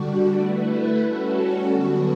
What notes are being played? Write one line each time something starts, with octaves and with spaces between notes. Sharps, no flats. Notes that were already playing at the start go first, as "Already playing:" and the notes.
Already playing: D3 G3 D4 F#4
A3 E4 B4
G3 C#4 F#4 A4
D3 F#3 B3 D4 F#4